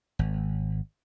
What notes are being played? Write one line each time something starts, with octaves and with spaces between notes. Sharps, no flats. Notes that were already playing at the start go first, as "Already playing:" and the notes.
G#1